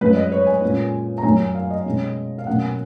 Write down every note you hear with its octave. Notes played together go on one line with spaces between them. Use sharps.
F#2 F3 G#3 C#4 B4
D#5
C#5
G#5
A#2 G#3 C#4
A#5
F#2 D#3 F#3 G#5
G#5
F5
D#5
B2 G#3 C#4
F5
B2 F#3 A#3 C#4 F#5
G#5